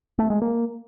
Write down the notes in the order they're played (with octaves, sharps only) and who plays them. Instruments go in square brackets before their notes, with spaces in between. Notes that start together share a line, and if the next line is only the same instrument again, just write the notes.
[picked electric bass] A3
G#3
A#3